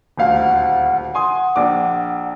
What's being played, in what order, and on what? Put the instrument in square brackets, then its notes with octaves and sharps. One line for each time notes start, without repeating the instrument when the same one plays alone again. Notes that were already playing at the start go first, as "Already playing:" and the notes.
[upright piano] D#1 D2 F5
[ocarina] F#5
[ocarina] F#5 [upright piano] G#5 C6 D#6
[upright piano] A#1 D4 D6